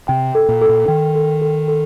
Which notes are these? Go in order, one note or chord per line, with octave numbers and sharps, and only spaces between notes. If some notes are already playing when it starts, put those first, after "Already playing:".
C3 G5
A4
A#2
A4
A#2
D#3 G5
A4
A4
A4